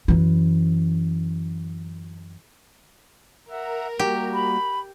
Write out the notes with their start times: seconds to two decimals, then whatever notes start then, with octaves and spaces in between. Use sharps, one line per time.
0.08 F#2 E3
3.50 A#4 E5 F#5
3.99 G3 A#3 F#4 G4
4.34 B5